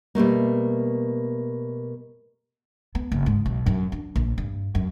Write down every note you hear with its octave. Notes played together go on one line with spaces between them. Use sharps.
B2 G3 A3 A#3
B3
F#1
G#2
B1
F#2
D4
A#1
G2
F#2